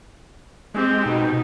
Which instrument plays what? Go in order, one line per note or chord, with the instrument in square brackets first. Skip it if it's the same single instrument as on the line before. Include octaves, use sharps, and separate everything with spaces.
[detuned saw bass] G#3 [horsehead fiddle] C4 G4
[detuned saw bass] B2 [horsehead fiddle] D#4